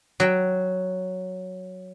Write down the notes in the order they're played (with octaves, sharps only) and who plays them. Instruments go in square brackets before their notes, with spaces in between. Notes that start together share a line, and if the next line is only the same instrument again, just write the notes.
[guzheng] F#3 G5